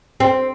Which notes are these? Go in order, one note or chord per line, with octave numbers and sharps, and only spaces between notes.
C4